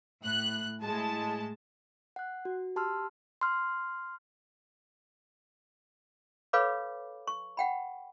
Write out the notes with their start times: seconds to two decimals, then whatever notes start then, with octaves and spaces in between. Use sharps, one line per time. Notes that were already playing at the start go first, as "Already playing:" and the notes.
0.21 A2 F#6
0.82 A2 G#3 A5
2.16 F#5 F#6
2.45 F#4
2.76 G4 A5 C6 E6 F6
3.41 C6 F6
6.53 A4 B4 C#5 F5 B5 D6
7.27 C#6
7.57 F#5 G5 B5